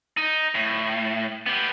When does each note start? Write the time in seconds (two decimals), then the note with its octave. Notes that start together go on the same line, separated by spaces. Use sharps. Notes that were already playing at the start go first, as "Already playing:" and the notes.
0.17 D#4
0.55 A2
1.46 B3 G4